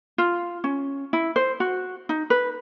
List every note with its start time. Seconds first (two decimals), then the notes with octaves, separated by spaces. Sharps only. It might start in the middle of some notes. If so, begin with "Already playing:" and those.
0.18 F4
0.64 C#4
1.13 E4
1.36 C5
1.60 F#4
2.09 D#4
2.30 B4